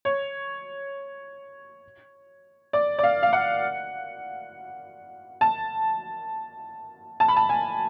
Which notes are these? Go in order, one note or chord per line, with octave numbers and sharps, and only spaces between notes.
C#5
D5
D5
F5
F5
F#5
A5
A5
B5
A5
G#5